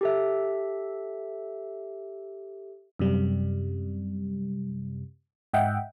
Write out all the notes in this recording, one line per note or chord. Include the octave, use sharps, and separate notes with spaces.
G4 A4 E5
F#2 C3 G3
G#2 D#5 E5 F#5 G5